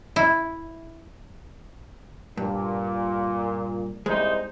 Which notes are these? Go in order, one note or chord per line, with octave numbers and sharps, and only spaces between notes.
E4
G2 A#2
C2 G#3 D#4 C5